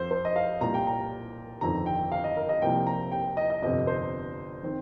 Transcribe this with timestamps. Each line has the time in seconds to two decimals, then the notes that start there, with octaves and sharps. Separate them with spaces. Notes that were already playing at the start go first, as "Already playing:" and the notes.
Already playing: F2 F3 C4 C5
0.11 C5
0.25 D#5
0.36 F5
0.61 C2 A#2 G3 A#5
0.74 G5
0.87 A#5
1.61 G1 F2 D#3 C4 A#5
1.86 G5
2.12 F5
2.24 D#5
2.37 A#4
2.49 D#5
2.62 C2 C3 F3 A#3 G5
2.87 A#5
3.12 G5
3.37 D#5
3.50 D#5
3.62 G1 F2 C3 D#5
3.87 C5
4.63 D#3 C4